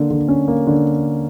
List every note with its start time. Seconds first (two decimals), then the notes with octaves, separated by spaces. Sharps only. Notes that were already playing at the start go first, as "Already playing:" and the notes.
Already playing: D3 A#3
0.10 D3
0.28 C#4
0.48 A#3
0.67 D3